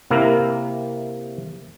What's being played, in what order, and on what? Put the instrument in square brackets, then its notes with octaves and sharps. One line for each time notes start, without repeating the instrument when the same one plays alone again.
[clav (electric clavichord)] C3 A#3 E4 A#4